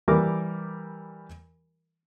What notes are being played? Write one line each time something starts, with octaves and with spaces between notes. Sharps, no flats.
E3 G3 A#4 D6